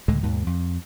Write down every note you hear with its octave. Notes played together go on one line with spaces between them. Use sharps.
C#2 A2 D3 G#3
D#2 G#2 B2 D#3
F2